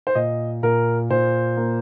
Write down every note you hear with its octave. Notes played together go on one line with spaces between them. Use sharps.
C5
A#2 D#5
A#2 A#4
A#2 C5
A#3